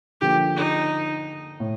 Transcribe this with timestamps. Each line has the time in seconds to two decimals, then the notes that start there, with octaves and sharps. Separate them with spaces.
0.21 D3 F3 A#3 G4
0.56 D#4
1.60 A2